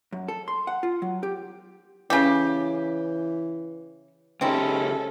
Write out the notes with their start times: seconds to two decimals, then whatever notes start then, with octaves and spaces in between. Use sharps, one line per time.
0.13 F#2
0.28 A4
0.48 C6
0.67 F#5
0.83 F4
1.02 F#3
1.23 G4
2.10 C#3 E3 G4
4.41 C#2 C4 C#4 D#4 E4 G4 A4